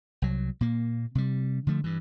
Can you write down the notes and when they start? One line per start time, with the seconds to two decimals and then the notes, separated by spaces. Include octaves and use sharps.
0.22 C2 F#3
0.61 A#2 A#3
1.15 C3 G3
1.67 D3 F3 A3
1.84 G2 E3